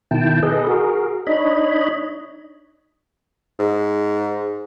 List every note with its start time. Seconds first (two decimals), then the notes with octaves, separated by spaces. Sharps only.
0.11 B2 D#3 E4 G5 A5
0.43 G#4 A4 B4 D#5
0.67 F#4 G#4 A#4
1.27 D4 D#4 C#5 D#5 B5
3.59 G#2